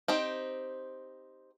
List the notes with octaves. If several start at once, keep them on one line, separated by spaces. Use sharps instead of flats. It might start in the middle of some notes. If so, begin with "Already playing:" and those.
C4 D#4 G4